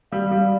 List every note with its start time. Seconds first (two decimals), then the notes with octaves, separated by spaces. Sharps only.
0.12 G3 F5
0.31 G3
0.42 D5